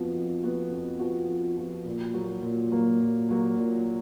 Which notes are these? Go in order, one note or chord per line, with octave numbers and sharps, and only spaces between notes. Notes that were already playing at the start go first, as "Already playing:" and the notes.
Already playing: F2 F3 B3 F#4
F2
F3 B3 F#4
F2
F3 B3 F#4
F2
F3 B3 F#4
A#2
F#3 A#3
A#2
F#3 A#3
A#2
F#3 A#3
A#2